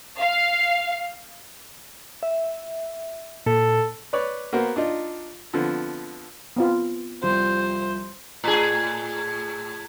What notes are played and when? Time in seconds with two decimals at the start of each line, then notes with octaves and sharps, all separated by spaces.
0.19 F5
2.23 E5
3.46 A#2 A4
4.13 B4 C#5 D5
4.53 A#3 B3 F#4 A#4 C5
4.76 D4 D#4 F4
5.53 D3 F3 B3 C4
6.56 B3 C4 F4
7.23 C2 F3 G3 C5
8.44 A2 G#4